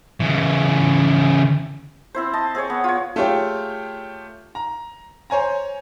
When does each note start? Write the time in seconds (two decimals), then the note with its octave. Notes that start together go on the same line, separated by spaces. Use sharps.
0.20 C#3 E3
2.15 C4 E4 C5
2.33 D#5 A5
2.55 C4 G#4 C#5
2.70 B3
2.84 F4 C#5
3.16 A3 F4 G4 G#4 C#5 G5
4.55 A#5
5.30 C5 C#5 G#5 A#5